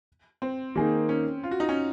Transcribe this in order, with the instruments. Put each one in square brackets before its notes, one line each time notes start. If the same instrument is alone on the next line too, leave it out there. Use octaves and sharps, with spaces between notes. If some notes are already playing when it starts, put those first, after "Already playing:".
[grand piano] C4
[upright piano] D#3 A#3 D#4 G#4
[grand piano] C#4
F4
F#4
D#4
C#4